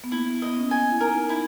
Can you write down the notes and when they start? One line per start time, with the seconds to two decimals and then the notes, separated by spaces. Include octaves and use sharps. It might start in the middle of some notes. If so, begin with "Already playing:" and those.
0.04 B3
0.12 A#3 E4
0.42 B3 D#5
0.57 C#4
0.71 G#5
0.92 E4
1.00 D#4 A#4
1.29 E4